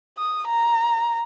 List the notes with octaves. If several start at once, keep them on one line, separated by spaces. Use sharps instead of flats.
D#6
A#5